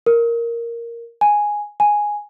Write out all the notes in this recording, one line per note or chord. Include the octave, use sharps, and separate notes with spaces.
A#4
G#5
G#5